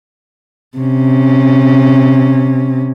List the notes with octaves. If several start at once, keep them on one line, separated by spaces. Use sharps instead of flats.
C3 C#4